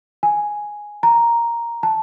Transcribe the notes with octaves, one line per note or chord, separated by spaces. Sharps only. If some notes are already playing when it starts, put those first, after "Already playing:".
G#5
A#5
A5